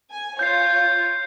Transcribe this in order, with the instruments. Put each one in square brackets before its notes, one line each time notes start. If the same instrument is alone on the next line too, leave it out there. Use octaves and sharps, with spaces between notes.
[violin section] G#5
[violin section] F4 C#5 [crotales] G6 C7